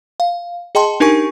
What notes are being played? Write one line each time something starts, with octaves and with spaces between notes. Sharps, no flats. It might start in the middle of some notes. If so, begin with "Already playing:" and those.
F5
G#4 D#5 G5 A5 C6
D4 D#4 G4 A#4 G#5 C#6